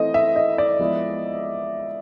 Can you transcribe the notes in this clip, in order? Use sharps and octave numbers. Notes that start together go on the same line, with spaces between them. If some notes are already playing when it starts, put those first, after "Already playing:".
Already playing: E3 A3 C4 D#5
E5
D#5
D5
F3 G#3 B3 E4